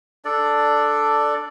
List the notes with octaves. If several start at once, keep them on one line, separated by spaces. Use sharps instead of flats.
D4 A4 D5